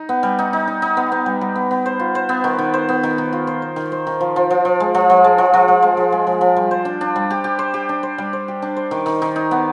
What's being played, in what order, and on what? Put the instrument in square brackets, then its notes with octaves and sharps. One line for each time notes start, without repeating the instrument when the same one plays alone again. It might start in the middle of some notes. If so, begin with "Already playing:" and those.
Already playing: [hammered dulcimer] D#4
B3
G3
D#4
D#4
D#4
D#4
B3
B3
G3
G3
B3
B3
C5
F4
C5
B3
D#3
D#3
C5
B3
D#3
D#3
F4
C5
C5
D#3
C5
D#3
F3
F3
F3
F3
G#3
F3
F3
G#3
F3
F3
F3
G#3
F3
G#3
F3
F3
G3
C5
D4
D4
G3
G4
G4
C5
G4
D4
C5
G3
C5
G4
D4
C5
D#3
D#3
D#3
D#4
B3